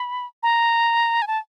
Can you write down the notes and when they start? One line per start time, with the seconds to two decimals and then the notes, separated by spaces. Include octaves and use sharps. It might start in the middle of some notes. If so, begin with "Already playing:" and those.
Already playing: B5
0.43 A#5
1.22 G#5
1.27 A5